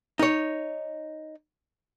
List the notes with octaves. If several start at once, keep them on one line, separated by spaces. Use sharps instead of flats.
D#4 C#5